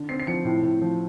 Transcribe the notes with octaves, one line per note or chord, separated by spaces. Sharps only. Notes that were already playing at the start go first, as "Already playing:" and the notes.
Already playing: D3
C4 C7
C7
F3 C#7
A2
A2
F3